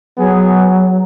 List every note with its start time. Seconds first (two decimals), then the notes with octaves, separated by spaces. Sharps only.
0.18 F#3 B3 G#4